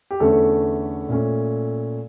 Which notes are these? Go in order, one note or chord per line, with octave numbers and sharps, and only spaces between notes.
G4
E2 D3 A3 C#4 A4
A#2 A3 C#4